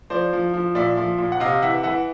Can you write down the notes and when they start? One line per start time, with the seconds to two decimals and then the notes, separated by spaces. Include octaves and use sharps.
0.10 F3 C5 D5
0.33 F3
0.53 F3
0.75 A#2 D5 E5
0.97 F3
1.18 A#2
1.32 F#5
1.40 C3 D#5 F5
1.62 E3 E5 F#5
1.83 E3 E5 F#5